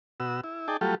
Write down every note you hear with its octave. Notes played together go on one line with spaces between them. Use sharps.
B2 F#4 E6
E4
D#4 G#4 D5 G5 A5
F#3 G3 A3 F4 G4 A4